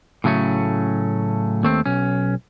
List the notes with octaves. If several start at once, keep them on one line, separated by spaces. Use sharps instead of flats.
A2 C#3 F#3 A3 C#4
D#2 A3 C4
B1 C#4